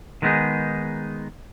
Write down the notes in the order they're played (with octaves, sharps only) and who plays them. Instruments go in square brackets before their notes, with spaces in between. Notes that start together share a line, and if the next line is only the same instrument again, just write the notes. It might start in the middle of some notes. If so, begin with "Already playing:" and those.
[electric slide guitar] D#3 G#3 A3 B3 D#4 G#4